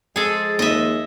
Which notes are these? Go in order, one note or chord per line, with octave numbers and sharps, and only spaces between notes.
F3 G#3 G#4 A4
D#2 D#5 E5